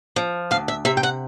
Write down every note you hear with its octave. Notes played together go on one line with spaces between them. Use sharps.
F3
D2 F5
E5
C3 E5
G5
F#5